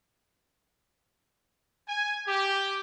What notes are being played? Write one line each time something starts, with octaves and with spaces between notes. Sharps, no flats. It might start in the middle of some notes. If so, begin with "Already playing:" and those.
G#5
G4